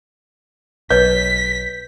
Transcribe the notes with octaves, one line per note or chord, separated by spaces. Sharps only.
B1 B2 B4 C#5 D#5 G6 B6